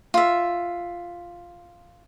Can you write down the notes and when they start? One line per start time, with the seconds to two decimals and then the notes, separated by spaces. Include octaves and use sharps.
0.14 F4 E5